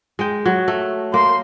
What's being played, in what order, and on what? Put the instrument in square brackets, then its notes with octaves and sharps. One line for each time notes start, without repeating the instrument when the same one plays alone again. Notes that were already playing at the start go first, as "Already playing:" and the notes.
[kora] G#3 G5
F#3
A3
[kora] A#3 [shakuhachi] C6